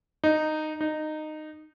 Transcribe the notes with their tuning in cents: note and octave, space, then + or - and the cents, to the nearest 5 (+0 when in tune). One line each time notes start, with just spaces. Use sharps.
D#4 -10
D#4 -15